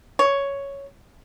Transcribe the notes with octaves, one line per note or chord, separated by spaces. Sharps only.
C#5